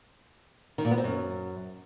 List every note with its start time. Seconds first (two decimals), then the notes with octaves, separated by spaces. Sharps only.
0.78 D#3
0.85 A#2
0.91 B3
0.98 C4
1.04 F#2